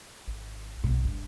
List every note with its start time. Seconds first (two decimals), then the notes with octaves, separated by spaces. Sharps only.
0.27 G#1
0.84 B1 B2
1.05 G1 G2